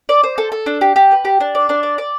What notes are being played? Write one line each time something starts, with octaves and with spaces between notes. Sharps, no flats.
D5
C5
A4
A4
D4
G4
G4
B4
G4
D4
D5
D4
D5
D5